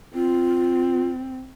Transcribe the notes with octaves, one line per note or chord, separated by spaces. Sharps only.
C4 F4